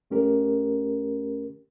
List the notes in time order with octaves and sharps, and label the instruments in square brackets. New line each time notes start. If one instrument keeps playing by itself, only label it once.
[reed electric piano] F2 A3 C#4 G4 A#4